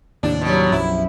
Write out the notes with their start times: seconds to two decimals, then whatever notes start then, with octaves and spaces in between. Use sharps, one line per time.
0.23 D#2 A2 C3 D4
0.41 B2 F#3 G3
0.72 B1 F#2 F3 E4